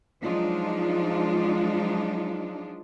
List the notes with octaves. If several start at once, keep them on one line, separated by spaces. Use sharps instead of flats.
F3 F#3 G#3 D4 D#4 F4